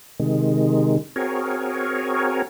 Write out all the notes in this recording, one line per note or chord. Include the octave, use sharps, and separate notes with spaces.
C3 D#3 G#3
C4 F#4 G#4 A#4 C#5